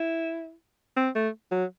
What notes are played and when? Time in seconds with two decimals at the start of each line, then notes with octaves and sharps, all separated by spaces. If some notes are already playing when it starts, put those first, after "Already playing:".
Already playing: E4
0.96 C4
1.15 A3
1.51 F#3